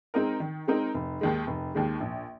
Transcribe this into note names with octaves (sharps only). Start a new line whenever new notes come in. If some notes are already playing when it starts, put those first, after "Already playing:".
G#3 C4 D#4 A#4
D#3
G#3 C4 D#4 A#4
F1
D#2 D#3 G#3
F1
D#2 D#3 G#3
A#1